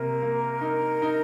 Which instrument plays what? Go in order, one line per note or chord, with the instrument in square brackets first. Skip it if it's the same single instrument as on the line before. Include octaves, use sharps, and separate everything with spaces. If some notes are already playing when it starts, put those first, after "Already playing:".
Already playing: [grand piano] C3 A#3 [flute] A#4
[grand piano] A#3
D#4
D#4